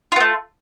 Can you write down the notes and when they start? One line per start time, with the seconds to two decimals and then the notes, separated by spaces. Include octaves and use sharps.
0.12 F4
0.16 B3
0.20 A3